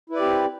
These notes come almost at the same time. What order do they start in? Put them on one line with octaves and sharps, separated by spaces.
E4 B4 D5 G4 C4